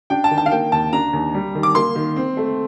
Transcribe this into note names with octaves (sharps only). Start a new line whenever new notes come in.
D4 G5
A5
D#3
A5
F5
A#3 G5
D#2 A5
D4 A#5
D#2
G3
D#3
D6
A#3 C6
D#3
C4
A3